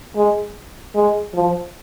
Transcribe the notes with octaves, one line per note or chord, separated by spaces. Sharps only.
G#3
G#3
F3